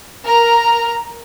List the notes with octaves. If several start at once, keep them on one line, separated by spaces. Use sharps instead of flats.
A#4 A#5